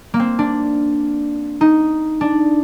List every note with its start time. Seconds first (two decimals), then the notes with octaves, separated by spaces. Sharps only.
0.14 A#3
0.20 C4
0.39 D4
1.61 D#4
2.21 D4